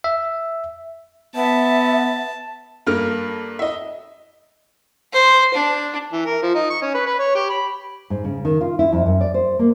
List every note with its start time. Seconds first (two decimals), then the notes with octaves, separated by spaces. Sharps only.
0.04 E5
1.36 B3 E5 A5
2.86 G2 A#3 A4 F6
3.59 D#5 E5
5.13 C5
5.54 D4
6.12 E3
6.26 A#4
6.43 F3
6.55 D#4
6.70 C#6
6.82 C#4
6.94 B4
7.06 B4
7.19 C#5
7.35 G4
7.50 B5
8.10 G#2
8.24 C#3
8.45 D#3
8.61 F4
8.79 E4
8.92 F2
9.06 F#2
9.21 D5
9.34 C5
9.59 A#3